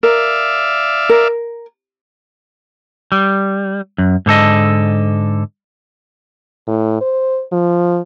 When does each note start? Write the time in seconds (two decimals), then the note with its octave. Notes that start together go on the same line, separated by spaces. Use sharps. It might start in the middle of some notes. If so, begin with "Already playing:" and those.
0.03 A#4 D5 E5 F5
1.09 A#4
3.12 G3
3.98 F#2
4.26 G#2 D3 A4 D#5
6.67 A2
7.01 C5
7.52 F3